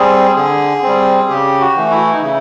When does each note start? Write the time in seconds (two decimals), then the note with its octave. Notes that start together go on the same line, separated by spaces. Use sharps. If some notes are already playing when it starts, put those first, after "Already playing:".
Already playing: G3 C4 G#4
0.36 D3 G#4
0.83 G3 C4
1.30 C#3 G4
1.61 F#4
1.76 E3 A3
1.91 E4
2.13 D#4
2.22 C#3 E4